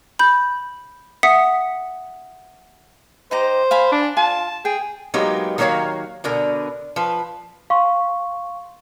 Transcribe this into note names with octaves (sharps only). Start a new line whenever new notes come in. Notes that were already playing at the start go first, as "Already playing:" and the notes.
B5 G6
E5 F#5 D#6 B6 C#7
D#4 G4 C5 A#5
F5 G#5 B5
D4
F4 A5
G#4 G5
F#3 G#3 A#3 B3 D#4 G4
D#3 F#3 A#3 G#4 C#5 F5
B2 D3 A#4
F3 B4
F5 C6 C#6